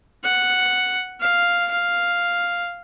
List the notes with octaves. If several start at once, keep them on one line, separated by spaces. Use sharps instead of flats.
F#5
F5
F5